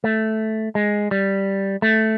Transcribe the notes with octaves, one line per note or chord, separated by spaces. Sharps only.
A3
G#3
G3
A3